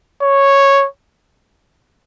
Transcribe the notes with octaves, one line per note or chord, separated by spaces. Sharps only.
C#5